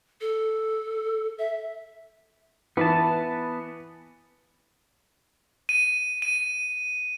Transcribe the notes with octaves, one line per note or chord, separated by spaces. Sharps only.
A4
E5
E3 B3 B4 A5
D#7
D#7